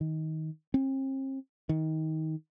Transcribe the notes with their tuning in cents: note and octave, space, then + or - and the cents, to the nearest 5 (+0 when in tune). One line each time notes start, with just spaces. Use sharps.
D#3 +20
C4 +40
D#3 +20